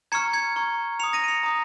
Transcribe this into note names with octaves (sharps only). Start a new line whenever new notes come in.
A#5 C#6 F6 G#6 C#7
G#6 C#7
A#5 C#6 F6
A#5 D#6 C#7 F7
A#6 D#7
D#7
C#7 F7
A#5 D#6